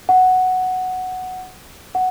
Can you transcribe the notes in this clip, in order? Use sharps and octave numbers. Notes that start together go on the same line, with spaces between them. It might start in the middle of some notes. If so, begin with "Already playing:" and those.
F#5
F#5